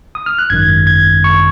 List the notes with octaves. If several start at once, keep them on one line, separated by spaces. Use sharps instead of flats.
D#6
F6
F#6
G#1 F#2 D#3 G#6
G#6
C#6